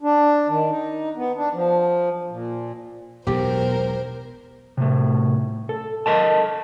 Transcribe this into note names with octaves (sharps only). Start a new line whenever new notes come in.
D4
D#3
D#4
B3
D4
F3
A#2
E1 B1 E2 B2 G4 A#4 C5
A2 C3
A4
A4 A#4 D#5 A5